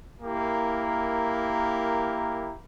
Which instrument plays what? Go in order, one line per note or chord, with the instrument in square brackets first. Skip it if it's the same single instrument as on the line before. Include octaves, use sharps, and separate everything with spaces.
[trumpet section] A#3 E4 G4 A#4